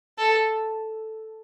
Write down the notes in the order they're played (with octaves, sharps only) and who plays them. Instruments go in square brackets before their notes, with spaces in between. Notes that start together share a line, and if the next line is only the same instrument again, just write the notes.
[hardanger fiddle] A4